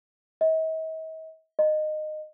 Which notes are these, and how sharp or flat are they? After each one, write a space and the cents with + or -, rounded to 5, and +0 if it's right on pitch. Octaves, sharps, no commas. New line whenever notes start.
D#5 +45
D#5 -20